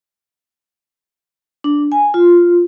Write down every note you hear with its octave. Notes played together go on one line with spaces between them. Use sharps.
D4
G#5
F4